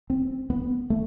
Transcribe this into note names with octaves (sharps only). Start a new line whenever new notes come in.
C4
B3
A3